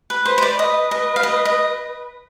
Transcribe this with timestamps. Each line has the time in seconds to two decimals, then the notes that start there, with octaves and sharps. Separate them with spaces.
0.10 B4
0.26 B4 C5
0.38 C5
0.42 D5
0.59 B4 D#5
0.91 D#5
1.16 F5
1.23 D#5
1.45 D#5